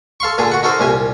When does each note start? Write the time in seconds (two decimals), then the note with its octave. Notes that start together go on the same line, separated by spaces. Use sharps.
0.20 A4 F5 C6 C#6
0.38 A#2 D3 D4 G#4
0.52 F#4 F#5
0.63 D#4 F#4 A4 A#4 C5
0.79 C2 A#2 G4 G#5